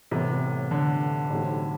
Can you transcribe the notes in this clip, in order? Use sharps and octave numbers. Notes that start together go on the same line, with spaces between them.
A1 A2 C3 E3 G3 B3
D3
B1 A2 E3 G3 C4